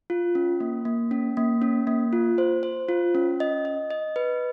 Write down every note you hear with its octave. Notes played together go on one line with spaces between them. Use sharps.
F4
C#4
A#3
A#3
C#4
A#3
C#4
A#3
F4
C5
C5
F4
C#4
D#5
D#5
D#5
B4